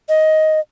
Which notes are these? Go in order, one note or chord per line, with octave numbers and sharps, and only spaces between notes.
D#5